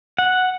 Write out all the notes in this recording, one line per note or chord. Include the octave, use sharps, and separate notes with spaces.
F#5